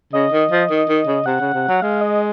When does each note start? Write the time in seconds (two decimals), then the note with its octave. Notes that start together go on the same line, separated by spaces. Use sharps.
0.13 C#3 D#5
0.32 D#3
0.51 F3
0.70 D#3
0.89 D#3
1.07 C#3
1.26 C3 F#5
1.40 C#3
1.54 C3
1.68 F#3
1.82 G#3 F5
2.01 D#5